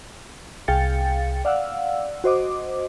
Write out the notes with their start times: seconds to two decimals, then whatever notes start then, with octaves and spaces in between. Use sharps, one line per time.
0.68 C2 G#4 F5 G5 A6 C#7
1.45 D5 F5 F#5 E6
2.24 F#4 C5 D#5 D6